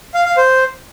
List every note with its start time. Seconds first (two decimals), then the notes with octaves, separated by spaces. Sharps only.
0.14 F5
0.26 F5
0.37 C5